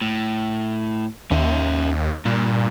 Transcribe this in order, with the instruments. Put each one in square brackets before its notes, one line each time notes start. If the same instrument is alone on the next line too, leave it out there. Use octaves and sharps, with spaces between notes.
[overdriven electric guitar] A2
[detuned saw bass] D#2 [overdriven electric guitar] C#4 E5
[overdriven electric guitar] G2 [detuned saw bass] A#2